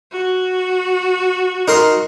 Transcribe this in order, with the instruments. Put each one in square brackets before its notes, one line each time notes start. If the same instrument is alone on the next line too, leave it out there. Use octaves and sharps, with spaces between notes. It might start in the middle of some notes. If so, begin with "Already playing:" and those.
[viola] F#4
[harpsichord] D#4 A#4 C6